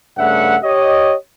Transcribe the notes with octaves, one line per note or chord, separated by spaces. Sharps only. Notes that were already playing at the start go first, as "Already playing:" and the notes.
G2 C#3 A3 E5 F#5
G4 C#5 D#5